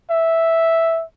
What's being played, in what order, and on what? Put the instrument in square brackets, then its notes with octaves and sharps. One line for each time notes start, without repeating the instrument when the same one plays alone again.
[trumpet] E5